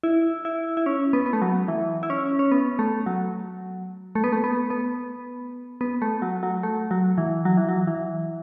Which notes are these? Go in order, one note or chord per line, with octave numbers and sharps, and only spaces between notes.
E4
E4
E4
C#4
B3
B3
A3
F#3
E3
E4
C#4
C#4
B3
A3
F#3
A3
B3
A3
B3
B3
B3
A3
F#3
F#3
A3
F#3
E3
F#3
E3
F#3
E3